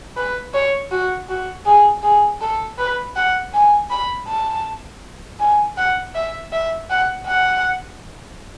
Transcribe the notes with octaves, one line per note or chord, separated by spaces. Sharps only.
B4
C#5
F#4
F#4
G#4
G#4
A4
B4
F#5
G#5
B5
A5
G#5
F#5
E5
E5
F#5
F#5